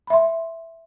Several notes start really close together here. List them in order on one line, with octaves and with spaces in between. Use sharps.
B5 E5 C6